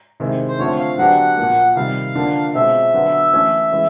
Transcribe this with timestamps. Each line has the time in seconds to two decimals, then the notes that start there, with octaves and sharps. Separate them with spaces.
0.20 C3 D#3 G#3 C4 E4
0.48 C5
0.59 D3 F3 A3 C4 C#5
0.78 F5
0.98 D3 F#3 B3 D4 G4 F#5
1.37 A#2 F3 A#3
1.76 C3 D#3 G3 F5
2.15 D3 F3 A#3 D4
2.55 B2 G#3 C4 F4 E5
2.94 D3 F#3 B3
3.34 E3 A3 C#4
3.72 E3 G#3 C#4